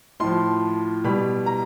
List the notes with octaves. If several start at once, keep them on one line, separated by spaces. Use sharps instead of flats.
A2 F3 C6
B2 G3 B5
A#5